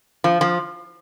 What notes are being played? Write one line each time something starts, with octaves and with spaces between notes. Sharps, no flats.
F3
F3